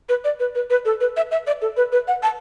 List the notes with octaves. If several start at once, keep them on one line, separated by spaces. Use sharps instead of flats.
B4
D5
B4
B4
B4
A4
B4
E5
E5
D5
A4
B4
B4
F#5
A5